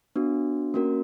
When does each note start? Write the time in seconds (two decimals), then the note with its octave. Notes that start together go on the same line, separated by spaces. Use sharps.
0.16 B3 D4 F#4
0.74 A#3 C#4 F#4 A#4